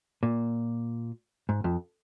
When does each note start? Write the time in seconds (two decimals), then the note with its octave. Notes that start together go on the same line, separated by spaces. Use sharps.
0.23 A#2
1.49 G#2
1.64 F2